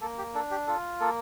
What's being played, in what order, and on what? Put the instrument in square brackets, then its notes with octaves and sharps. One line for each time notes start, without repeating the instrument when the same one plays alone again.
[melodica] A#3 A4
G4
D4 A4
G4
F4 A4
A#3 A4